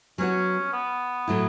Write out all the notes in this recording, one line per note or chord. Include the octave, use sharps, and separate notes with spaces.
F#3 B3 C#4 F#4
B3
A2 F#3 A3 E4